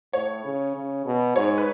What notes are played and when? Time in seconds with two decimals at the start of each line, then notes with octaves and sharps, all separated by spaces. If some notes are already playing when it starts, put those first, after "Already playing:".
0.13 A2 C#5
0.45 C#3
0.75 C#3
1.06 B2
1.36 G#2 C#5
1.58 B4